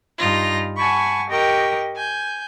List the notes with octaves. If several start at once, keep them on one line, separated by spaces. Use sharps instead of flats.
G2 D#4 F4 A#6
F#5 G#5 A5 B5 C#6
G4 A#4 D#5 G5 C#6
G#5 G6